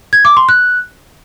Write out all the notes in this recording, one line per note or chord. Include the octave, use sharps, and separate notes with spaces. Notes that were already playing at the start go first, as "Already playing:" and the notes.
G#6
D6
C6
F#6